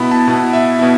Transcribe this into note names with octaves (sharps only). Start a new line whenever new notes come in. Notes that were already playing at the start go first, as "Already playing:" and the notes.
Already playing: B2 B3 E4 B5
A5
B2 B3 E4
E5
B2 B3 E4